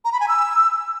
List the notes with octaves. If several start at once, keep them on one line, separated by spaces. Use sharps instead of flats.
A#5
B5
G#5
E6